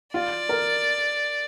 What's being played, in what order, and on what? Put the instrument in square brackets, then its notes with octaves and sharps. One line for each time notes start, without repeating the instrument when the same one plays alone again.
[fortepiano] F4 [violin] D5
[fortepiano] A#4